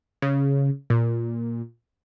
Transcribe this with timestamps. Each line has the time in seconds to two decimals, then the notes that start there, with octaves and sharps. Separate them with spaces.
0.22 C#3
0.90 A#2